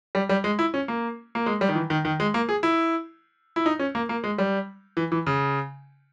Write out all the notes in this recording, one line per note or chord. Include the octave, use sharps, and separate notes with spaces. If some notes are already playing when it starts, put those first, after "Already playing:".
G3
G3
G#3
E4
C#4
A#3
A#3
G#3
G3
D#3
E3
D#3
D#3
G#3
A#3
G#4
E4
E4
D#4
C#4
A#3
A#3
G#3
G3
E3
E3
C#3